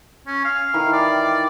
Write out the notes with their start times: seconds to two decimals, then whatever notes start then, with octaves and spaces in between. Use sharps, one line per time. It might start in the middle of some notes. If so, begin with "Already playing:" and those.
0.27 C#4
0.45 F5
0.74 D#3 E3
0.93 D5 G5